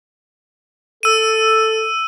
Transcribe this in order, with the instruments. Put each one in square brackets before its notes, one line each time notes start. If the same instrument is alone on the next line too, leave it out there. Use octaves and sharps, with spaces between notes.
[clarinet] A4 [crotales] E6 D#7